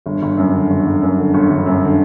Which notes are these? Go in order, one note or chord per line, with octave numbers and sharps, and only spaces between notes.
G1
G1
F#2
D3
G1
G1
F#2
D3
G1
G1
F#2
D3